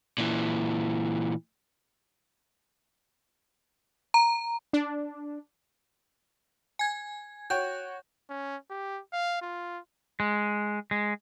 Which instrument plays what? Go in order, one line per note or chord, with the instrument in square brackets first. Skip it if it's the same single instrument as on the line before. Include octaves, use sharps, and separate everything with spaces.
[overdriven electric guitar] A#2 E3
[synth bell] A#5
[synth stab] D4
[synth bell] G#5 G#6
[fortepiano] F#4 C#5 G5 [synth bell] G6
[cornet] C#4
G4
F5
F4
[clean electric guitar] G#3
G#3